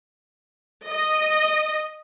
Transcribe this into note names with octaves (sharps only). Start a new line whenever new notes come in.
D#5